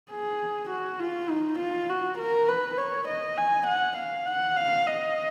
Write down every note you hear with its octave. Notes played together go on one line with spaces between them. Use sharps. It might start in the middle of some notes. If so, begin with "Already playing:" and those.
G#4
F#4
F4
D#4
F4
F#4
A#4
B4
C#5
D#5
G#5
F#5
F5
F#5
F5
D#5